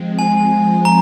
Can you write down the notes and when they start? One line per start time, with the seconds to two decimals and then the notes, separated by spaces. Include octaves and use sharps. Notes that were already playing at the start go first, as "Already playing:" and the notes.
Already playing: F3 G#3 C4
0.19 G#5
0.85 A#5